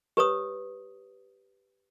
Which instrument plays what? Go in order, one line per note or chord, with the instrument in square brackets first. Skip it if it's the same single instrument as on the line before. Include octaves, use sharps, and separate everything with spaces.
[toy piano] G4 B4 C#5 D#6